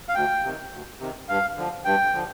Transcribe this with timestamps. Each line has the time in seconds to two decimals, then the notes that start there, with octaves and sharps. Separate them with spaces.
0.09 F5
0.15 D2 G5
0.43 C3 D#3
0.72 D2
1.00 C3 D#3
1.29 G2 F5
1.57 D3 F3
1.85 G2 G5
2.14 D3 F3